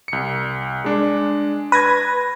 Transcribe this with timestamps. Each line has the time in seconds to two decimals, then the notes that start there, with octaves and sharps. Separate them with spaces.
0.08 C2 C#7
0.84 G#3 D4
1.72 B4 G#6 A#6 D#7